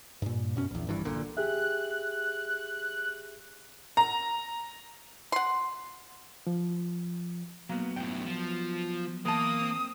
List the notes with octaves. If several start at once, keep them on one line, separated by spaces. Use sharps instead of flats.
G2 A#2
F#2 B2 C#4
A#1 E2
G#1 G2 E3
A#1 A#2 D3
G4 G#4 E5 F#6
A#5
F#5 C6
F3
F#3 A#3 B3
F#2 A2 G5
F3
E3 A#3 A5 D#6
C4